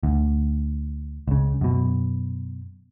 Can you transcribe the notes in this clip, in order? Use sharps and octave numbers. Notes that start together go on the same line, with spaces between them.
D2
C#2 C#3
F#2 B2